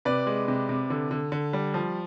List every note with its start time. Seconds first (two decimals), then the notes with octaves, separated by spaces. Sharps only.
0.05 C3 B4 D5
0.27 G#3
0.48 C3
0.69 C3
0.90 D3
1.11 D3
1.32 D3
1.53 G3
1.74 F3